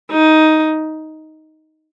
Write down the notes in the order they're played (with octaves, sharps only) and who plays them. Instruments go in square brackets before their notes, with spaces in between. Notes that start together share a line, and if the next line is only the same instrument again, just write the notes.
[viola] D#4